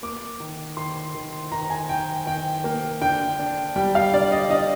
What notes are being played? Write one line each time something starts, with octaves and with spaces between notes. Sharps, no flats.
A#3 D6
D#3
D#3 C6
D#3
D#3 A#5
G#5
D#3 G5
D#3 G5
A#3
D3 G5
D4
G3 G5
F5
D3 D5
D#5
D3 D#5